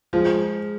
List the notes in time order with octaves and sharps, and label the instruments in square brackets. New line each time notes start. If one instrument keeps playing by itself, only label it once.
[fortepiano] F3 [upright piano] G#3